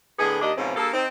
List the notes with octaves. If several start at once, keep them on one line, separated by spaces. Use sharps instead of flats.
A2 D3 B3 G#4
D#2 D4 D#5
G#2 B2 E3 F3 C4 C#4
G2 A#3 G#4 A4
C4 D#4